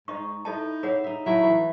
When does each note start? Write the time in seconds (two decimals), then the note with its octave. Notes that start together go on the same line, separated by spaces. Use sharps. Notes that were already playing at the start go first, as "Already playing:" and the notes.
0.08 G#2 D#4 D#5 C#6
0.45 D#4 E4 A4 D#5 A5
0.83 G#4 C#5 E5 F#5
1.04 D#4 E5
1.26 F#3 A3 E4
1.44 E3